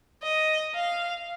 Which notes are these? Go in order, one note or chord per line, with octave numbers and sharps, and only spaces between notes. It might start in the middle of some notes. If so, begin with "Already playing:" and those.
D#5
F5